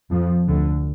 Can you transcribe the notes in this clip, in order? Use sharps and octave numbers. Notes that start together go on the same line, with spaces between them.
F2 F3
D2 D3